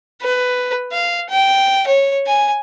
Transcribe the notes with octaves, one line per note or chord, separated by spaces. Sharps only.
B4
F5
G5
C#5
G#5